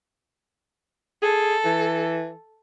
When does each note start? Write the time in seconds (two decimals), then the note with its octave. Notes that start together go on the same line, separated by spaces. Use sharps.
1.22 G#4 A4
1.64 E3